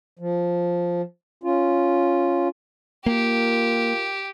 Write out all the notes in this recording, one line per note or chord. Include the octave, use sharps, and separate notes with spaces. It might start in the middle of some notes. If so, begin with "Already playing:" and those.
F3
C#4 F4
A#3 F4 G4 A#4